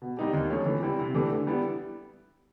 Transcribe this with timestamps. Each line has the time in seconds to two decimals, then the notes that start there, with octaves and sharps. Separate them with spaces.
0.02 B2
0.17 G3 C4 D#4 G4
0.33 D#2
0.50 C#3 F3 A3 C#4
0.66 E3
0.83 G3 C4 E4
0.99 C3
1.15 E3 A3 D4 G4
1.30 D3
1.47 G3 B3 E4